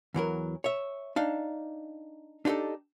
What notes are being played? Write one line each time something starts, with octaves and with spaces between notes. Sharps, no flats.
E2 E3 F#3 A#4
C#5 E5
D4 D#4 F5
D4 D#4 F4 G4 A4